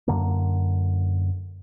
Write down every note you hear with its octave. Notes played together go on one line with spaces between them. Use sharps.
F#2 D3 A#3